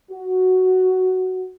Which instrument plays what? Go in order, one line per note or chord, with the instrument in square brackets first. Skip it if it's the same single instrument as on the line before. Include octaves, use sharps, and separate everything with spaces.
[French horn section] F#4